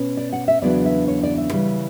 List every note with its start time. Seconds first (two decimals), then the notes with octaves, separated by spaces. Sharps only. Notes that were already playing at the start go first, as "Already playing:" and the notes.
Already playing: B2 C#4
0.17 D5
0.33 F#5
0.48 E5
0.62 E2 C#3 F#3 B3 D4 D5
0.86 E5
1.08 C#5
1.23 D5
1.38 E5
1.53 C#3 E3 G3